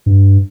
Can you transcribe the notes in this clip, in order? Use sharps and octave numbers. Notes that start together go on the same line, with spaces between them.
G2